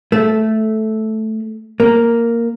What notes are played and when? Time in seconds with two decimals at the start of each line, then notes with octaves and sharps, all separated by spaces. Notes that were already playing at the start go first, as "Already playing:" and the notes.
0.12 A3
1.80 A#3